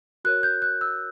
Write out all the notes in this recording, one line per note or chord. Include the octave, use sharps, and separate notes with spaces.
F#4 A#4 C#5 F#6
G6
F#6
E6